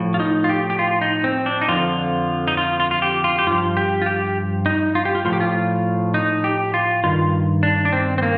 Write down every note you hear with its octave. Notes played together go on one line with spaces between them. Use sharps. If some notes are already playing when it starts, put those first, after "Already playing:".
Already playing: A2 F3
F4
D#4
F4
G4
G4
F4
D#4
C4
D4
D#4
F2 D3 F3 F4
D#4
F4
F4
F4
G4
F4
G4
G2 F3 F4
G4
F4
G4
D#4
F4
G4
F4
A2 F3 F4
G4
F4
D#4
G4
F4
G2 D#3 F4
D4
D4
C4
C4
A#3